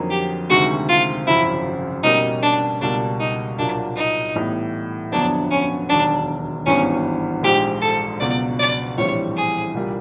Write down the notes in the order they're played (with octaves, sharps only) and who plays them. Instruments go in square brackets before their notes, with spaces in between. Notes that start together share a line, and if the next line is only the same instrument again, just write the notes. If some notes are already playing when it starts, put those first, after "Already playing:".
Already playing: [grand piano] F2 D3 F#3 A#3 D#4
[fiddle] G4
[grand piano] D2 C3 D#3 G#3 [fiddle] F#4
[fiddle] F4
[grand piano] G#1 F#2 C#3 F3 [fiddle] E4
[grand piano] B2 G3 A#3 C#4 [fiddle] D#4
[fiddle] D4
[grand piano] C#2 B2 G3 A#3 [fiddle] D4
[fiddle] D#4
[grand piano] C2 A#2 F#3 A#3 [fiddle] D4
[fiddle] D#4
[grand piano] A2 E3 G3 B3 D#4
[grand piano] G1 F2 D3 F#3 B3 [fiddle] D4
[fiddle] C#4
[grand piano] E1 D#2 D#3 F#3 [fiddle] D4
[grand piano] G#1 G2 E3 G3 B3 [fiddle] C#4
[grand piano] A#1 G#2 F3 G#3 [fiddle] G4
[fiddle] A4
[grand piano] C#2 B2 F#3 B3 [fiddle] D5
[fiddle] D5
[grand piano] A#1 A2 E3 G3 C4 [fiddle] C#5
[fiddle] G#4
[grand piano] C2 A#2 G3 A#3